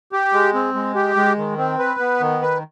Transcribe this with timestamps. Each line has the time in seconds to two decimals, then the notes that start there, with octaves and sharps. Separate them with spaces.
0.12 G4
0.33 G#3
0.54 C4
0.74 G#3
0.95 G4
1.16 G#3
1.38 D#3
1.58 C4
1.79 B4
2.00 B3
2.20 D#3
2.42 B4